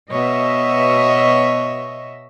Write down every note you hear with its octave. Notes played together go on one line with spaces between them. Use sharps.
B2 C#5 D#5 E5